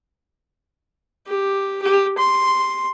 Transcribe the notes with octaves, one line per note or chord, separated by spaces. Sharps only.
G4
G4
C6